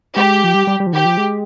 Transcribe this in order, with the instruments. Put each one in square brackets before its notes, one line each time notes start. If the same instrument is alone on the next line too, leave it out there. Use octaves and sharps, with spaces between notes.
[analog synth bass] G#3 [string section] G4
[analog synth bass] F3
G3
G3
G3
F3
[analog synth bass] D#3 [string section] G4
[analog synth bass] F3
G#3